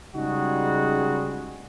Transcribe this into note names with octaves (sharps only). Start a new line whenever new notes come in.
C#3 G3 G#3 D#4 F#4 G#4